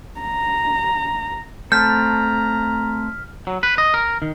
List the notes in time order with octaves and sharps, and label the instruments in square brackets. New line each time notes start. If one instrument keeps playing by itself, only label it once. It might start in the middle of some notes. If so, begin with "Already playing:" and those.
[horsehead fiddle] A#5
[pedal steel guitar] A3 C4 A5 [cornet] A#5 [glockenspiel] F6 B6 [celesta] G6
[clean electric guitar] F#3
B4
D#5
A#4
D#3